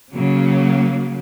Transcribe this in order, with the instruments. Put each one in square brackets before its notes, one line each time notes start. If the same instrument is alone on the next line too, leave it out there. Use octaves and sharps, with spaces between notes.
[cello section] C#3 F#3 A#3